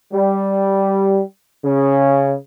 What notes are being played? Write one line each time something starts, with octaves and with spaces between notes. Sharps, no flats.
G3
C#3